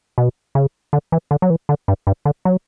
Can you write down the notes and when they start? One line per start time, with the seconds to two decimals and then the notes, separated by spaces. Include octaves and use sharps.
0.18 B2
0.55 C#3
0.93 D3
1.12 E3
1.31 D3
1.42 F#3
1.50 E3
1.69 D3
1.88 G2
2.07 G2
2.25 D3
2.45 F#3